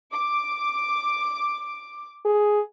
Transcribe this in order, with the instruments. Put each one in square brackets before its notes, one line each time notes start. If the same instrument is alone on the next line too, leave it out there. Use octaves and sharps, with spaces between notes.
[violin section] D6
[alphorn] G#4